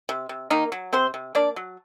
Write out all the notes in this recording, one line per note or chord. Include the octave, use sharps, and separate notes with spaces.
C3
C3
D#3 A#3 D#4
F#3
C3 C4 C5
C3
A#3 D4 D5
F#3